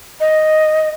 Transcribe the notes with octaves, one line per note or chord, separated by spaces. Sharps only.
D#5